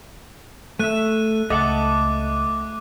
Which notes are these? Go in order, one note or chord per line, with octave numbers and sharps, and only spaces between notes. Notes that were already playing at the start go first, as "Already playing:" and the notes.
A3 E5 F#6 D#7
C#2 A3 D#5 F#5 A5 D6